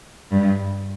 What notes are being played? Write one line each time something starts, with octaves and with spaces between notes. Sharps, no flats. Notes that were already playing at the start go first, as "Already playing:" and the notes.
G2